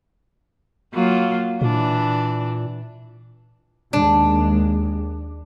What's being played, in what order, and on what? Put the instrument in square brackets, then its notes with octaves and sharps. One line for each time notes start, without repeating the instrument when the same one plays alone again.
[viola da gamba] F#3 A#3 F4
[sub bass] A#2 [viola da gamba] E3 D4
[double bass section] D#2 G#3 [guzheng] D4